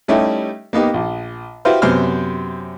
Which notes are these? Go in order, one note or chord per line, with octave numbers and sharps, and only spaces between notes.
G3 A3 C#4 D#4 E4 G4
A#3 B3 D#4 G4
A#1
E4 F#4 G4 B4 C5 F5
F#2 C3 B3 C5 C6 F6